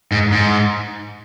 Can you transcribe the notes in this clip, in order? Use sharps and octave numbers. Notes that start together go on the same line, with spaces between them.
G#2
G#2